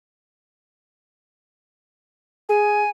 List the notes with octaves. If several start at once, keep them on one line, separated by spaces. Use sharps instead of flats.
G#4 G#5